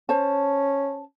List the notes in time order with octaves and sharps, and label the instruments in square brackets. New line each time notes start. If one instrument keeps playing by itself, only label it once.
[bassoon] C#4 [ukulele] C5 A5